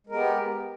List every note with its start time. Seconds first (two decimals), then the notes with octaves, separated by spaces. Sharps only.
0.07 G#3
0.09 A#4
0.12 B3
0.15 G4